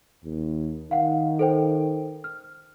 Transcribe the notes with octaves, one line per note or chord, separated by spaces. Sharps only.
D#2
D#3 F5 F#5
A4 C5 G5
F6